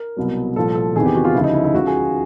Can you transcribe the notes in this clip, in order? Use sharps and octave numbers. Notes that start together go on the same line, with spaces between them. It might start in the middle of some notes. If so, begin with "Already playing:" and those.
Already playing: A#4
C2 B2 F#3
C2 A#2 F3 A4
A4
E2 C3 D#3 G#4
G4
F#4
F4
D2 C#3 F3 E4
D#4
E4
E4
C#2 C#3 F3 F#4
G#4